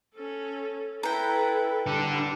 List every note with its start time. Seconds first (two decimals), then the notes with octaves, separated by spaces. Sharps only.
0.14 C#4 A4
1.03 E4 A4 B4 G5 A#5
1.87 G3 D4 A4